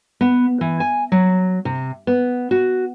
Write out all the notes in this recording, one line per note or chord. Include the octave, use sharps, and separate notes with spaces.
B3
E3
G#5
F#3
C3
B3
F#4